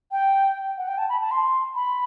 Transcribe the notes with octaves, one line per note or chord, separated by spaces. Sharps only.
G5
F#5
G5
A5
B5
A5
C6
B5